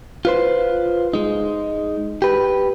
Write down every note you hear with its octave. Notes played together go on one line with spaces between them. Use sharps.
F4 B4 C5
G#3 D#4
G4 B4